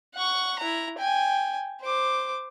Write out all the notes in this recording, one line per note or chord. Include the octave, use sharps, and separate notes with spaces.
F#5 C#6
E4 A#5
G5 G#5
C5 D6